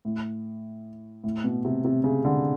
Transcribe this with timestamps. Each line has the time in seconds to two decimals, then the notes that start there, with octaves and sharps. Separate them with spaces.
0.05 A2
1.24 A2
1.44 B2
1.65 C3
1.85 C3
2.04 C#3
2.25 D3